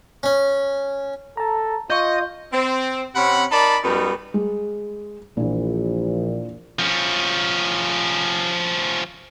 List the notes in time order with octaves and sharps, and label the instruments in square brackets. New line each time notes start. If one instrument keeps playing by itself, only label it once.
[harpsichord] C#4
[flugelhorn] A4 [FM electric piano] A5 A#5
[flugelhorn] F4 [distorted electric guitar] D#5 [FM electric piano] C#6 G6
[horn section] C4
C3 C4 C#4 F#5 B5
D#4 A#4 D5 A5 B5
F#2 G3 B3 D#4
[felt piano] G#3
[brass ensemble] A#1 [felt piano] A#2 E3
[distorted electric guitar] F3 C#4